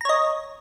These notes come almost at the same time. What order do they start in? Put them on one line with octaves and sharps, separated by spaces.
A#5 C#5 D#5